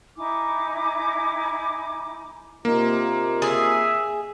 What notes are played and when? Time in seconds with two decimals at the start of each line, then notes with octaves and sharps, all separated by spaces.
0.17 D#4 E4 G#5 D6
2.65 C3 A#3 D#4 F4
3.42 G#4 E5